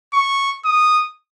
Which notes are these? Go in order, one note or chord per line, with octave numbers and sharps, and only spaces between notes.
C#6
D#6